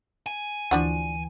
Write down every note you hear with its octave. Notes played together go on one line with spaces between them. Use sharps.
G#5
D2 E3 F3 D4 F#4